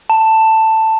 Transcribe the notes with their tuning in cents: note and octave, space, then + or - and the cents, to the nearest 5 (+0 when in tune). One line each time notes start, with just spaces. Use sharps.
A5 +10